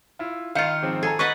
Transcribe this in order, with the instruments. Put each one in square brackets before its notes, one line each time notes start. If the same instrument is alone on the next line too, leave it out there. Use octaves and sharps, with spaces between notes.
[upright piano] E4 F4
[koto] D#3 F4 [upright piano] F5 G6 C#7
[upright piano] G#2 F3 C4
[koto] G#4 [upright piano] A4 G#5 A#5
[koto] B4 D#5 F#5 [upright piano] C#6 A6 B6